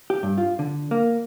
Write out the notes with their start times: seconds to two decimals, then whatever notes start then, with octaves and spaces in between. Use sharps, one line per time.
0.10 G4
0.23 G2
0.38 F4
0.59 D3
0.91 A#3